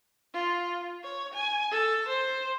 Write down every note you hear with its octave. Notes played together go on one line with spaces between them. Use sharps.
F4
C#5
G#5
A4
C5